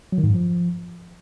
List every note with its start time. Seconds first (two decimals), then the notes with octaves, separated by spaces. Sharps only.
0.12 F#3
0.18 D#3
0.23 G#2
0.29 G2
0.34 F3